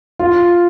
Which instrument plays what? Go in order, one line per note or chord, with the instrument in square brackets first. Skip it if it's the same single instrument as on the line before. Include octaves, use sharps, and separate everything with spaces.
[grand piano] F4